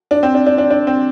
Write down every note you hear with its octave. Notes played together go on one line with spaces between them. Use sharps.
D4
C4
D4
D4
D4
D4
C4